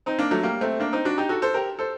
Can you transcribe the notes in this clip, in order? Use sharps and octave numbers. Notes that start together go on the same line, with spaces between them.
C4 D#4
A#3 D4
F#3 A3
G3 A#3
A3 C4
A#3 D4
C4 D#4
D4 F#4
D#4 G4
F#4 A4
A4 C5
G4 A#4
A4 C5